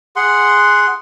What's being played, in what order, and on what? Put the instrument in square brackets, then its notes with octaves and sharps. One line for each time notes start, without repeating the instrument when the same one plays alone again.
[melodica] G#4 F#5 C6